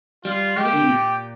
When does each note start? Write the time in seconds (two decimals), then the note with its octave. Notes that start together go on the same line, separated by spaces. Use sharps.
0.25 G3 F4
0.57 G#3 G4
0.65 A#3
0.73 D3
0.81 C3
0.89 A#2